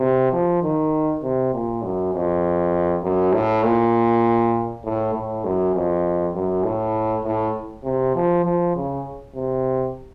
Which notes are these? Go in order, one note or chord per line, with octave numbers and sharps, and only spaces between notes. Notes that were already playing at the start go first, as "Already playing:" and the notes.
Already playing: C3
F3
D#3
C3
A#2
F#2
F2
F#2
A2
A#2
A2
A2
F#2
F2
F#2
A2
A2
C3
F3
F3
C#3
C3